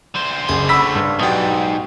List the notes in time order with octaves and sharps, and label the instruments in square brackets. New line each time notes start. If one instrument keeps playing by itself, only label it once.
[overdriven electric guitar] D3 C5
[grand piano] F#1 [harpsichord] G#4
[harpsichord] C#3 F#5 [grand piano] B5 E6 B6
[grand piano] G2
[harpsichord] B1 G3 [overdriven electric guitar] G#2 [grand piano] G5 D#6